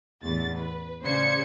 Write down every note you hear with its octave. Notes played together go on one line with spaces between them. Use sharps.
A1 E2 A6
B4
A1 C#3 C5 D5 G#6 C#7